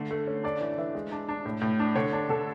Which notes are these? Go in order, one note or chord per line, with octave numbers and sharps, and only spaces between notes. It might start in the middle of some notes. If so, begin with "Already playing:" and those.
Already playing: D3 A3
A3
C#4
D4 D5
E3 D5
E3 E5
G#3
D4
D4
A2
A2
D4
D3 C#5
D4
D3 A4